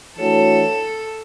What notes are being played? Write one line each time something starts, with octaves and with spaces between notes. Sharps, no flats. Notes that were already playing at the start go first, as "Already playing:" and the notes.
E3 A3 D4 F#4 A4 C#5